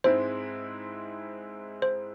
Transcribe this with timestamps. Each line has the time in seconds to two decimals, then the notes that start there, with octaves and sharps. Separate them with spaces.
0.04 G#2 G#3 C4 E4 C5
1.82 C5